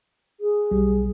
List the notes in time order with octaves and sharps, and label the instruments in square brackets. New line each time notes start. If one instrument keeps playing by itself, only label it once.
[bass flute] G#4
[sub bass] B1 [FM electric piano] G3